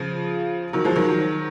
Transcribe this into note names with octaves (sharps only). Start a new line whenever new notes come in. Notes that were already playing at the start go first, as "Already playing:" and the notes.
Already playing: C#3 F3
D#3 F#3
F3 G#3
D#3 F#3